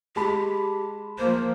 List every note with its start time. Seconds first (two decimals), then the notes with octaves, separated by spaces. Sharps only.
0.16 G#3 G4 A5 B5
1.18 F3 A#3 C5